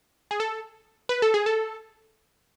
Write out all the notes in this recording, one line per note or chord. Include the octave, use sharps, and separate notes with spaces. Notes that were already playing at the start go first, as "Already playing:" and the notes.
G#4
A4
B4
A4
G#4
A4